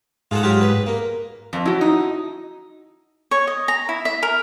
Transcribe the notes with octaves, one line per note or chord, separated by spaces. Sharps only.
G#2 F4 A4 F#5
F#3 F4 G4
B4
A#3
F2
F#3 E4 F#4
D#4
C#5
D#5
A#5
E4
E5
A#4